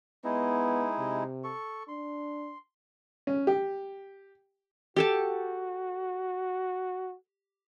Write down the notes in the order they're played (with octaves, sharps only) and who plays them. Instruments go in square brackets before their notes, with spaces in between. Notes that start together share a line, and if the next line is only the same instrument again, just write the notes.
[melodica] G#3 D#4 E4 [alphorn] B3
[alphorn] C3
[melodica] A4 C#6
[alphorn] D4 [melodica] C6
[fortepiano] C#4
G4
[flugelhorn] F#4 [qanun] G4 A4 A5